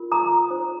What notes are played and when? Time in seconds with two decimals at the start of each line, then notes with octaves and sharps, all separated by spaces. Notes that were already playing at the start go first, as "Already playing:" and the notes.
Already playing: F4 A#4
0.12 A#5 D#6
0.51 F4 C5